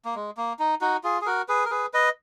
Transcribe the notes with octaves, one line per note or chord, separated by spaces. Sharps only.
A#3
G#3
A#3
D#4
D#4 F#4
F4 G#4
G#4
F#4 A#4
G#4 B4
A#4
G#4 B4
B4 D#5